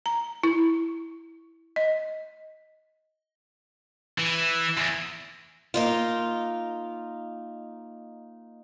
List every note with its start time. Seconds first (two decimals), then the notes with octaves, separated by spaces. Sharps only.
0.06 A#5
0.43 E4
1.76 D#5
4.18 E3
4.77 E2
5.74 A#3 D#4 F4